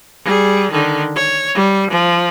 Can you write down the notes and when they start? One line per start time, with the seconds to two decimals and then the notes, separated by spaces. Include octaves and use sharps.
0.24 G3 G#4
0.71 D3 D#3
1.15 C#5
1.55 G3
1.90 F3